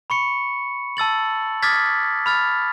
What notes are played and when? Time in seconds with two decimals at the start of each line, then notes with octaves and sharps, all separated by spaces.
0.10 B5 C#6 C#7
0.97 A5 E6 A6 F#7
1.62 D6 D#6 F6 G#6 A6 B6
2.26 B5 F6 A6